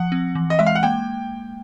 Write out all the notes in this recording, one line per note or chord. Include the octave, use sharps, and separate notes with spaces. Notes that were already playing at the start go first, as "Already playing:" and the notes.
Already playing: F3 F#5
C4
E3
D#5
G#3 E5
F5
F#5
A#3 G5